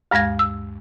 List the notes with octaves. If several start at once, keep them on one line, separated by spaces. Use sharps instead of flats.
D2 G2 G#3 F5 G#6 A#6
E6